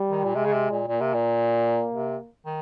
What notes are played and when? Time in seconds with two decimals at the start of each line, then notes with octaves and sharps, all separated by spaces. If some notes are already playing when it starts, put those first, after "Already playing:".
Already playing: G3
0.10 D#3
0.24 A#2
0.35 C3 G#3
0.46 C#3
0.53 C3
0.71 A#2
0.88 A#2 A#3
1.01 C3
1.14 A#2
1.93 C3
2.46 D#3